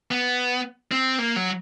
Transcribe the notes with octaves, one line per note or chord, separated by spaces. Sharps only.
B3
C4
A#3
F#3